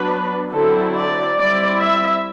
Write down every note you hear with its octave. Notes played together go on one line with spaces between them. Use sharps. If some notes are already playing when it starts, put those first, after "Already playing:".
Already playing: F#3 B3 D4 B4
D3 F#3 C4 E4 A4
D5
G3 C4 E4 D5
E5